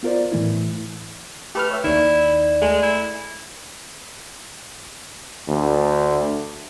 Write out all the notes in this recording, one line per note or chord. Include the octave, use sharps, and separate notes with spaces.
B3 F4 A#4 C5 D5
A2 E3 A3 E4
A3 G4 B4 F6
C#5 E5
D#2 D#3 E4 D5
G#3 A3
E4
D2